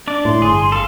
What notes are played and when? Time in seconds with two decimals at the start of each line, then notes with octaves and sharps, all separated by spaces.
0.08 D4 D5
0.25 A2 C6
0.42 G1 G#4
0.72 A4 F5